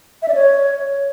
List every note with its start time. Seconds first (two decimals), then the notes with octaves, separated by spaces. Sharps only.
0.22 E5
0.28 D5
0.34 C#5